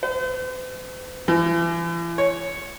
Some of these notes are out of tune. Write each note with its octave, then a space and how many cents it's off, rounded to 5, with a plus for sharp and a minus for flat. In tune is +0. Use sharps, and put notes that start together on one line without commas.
C5 -45
E3 +40
C#5 +0